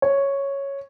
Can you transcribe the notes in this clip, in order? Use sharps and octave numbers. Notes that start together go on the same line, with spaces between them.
C#5